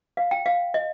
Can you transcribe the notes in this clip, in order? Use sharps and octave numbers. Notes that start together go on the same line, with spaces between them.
F5
G5
F5
D#5